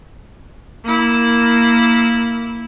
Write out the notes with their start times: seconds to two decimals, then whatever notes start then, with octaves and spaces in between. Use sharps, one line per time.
0.84 A#3 E4